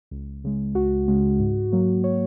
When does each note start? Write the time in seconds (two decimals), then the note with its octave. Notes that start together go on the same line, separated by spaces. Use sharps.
0.11 C#2
0.44 C#3 G#3
0.75 C#2 F#4
1.08 C#3 G#3
1.39 G#2
1.72 F#3 A#3
2.04 C#5